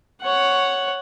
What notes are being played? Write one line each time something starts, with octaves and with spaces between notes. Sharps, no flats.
C#5 F#5